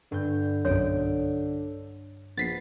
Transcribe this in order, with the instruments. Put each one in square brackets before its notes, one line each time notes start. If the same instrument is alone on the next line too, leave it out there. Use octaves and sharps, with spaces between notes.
[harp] G2 G6 [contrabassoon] D3
[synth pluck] B1 F#2 [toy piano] C#5 [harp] D#6 D7
[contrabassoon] A#1 [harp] B3 [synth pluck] A6 B6 C7